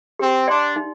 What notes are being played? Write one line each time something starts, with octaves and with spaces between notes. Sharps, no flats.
C4 G4
D4 D5 G5 C6
D#4